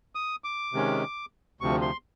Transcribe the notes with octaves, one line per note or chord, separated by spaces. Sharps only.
D#6
D6
C3 D#3 G#3 C#4
D2 C3 F3 C#6
C6